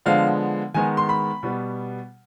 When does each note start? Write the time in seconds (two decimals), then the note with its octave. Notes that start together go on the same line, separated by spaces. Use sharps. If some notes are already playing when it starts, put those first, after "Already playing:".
0.06 D3 F3 G#3 B3 F5
0.74 D#3 G#3 B3 G#5
0.97 C6
1.09 B5
1.43 B2 G3 B3